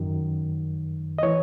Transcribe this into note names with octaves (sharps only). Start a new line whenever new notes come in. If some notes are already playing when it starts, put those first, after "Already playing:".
Already playing: F#2 D#3
D#5
E3 C#5